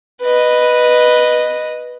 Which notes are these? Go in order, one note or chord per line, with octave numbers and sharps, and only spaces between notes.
B4 D#5